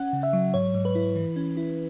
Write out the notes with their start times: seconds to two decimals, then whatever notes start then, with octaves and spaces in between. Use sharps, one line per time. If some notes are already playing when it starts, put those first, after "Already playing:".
Already playing: C#4 F#5
0.13 C#3
0.23 E5
0.33 F#3
0.54 G#2 C#5
0.74 G#2
0.85 B4
0.95 E4
1.16 E3
1.36 C#4
1.57 E4